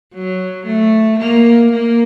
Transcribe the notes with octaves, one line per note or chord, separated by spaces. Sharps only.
F#3
A3
A#3
A#3